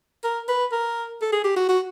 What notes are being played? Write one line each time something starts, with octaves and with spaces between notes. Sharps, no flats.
A#4
B4
A#4
A4
G#4
G4
F#4
F#4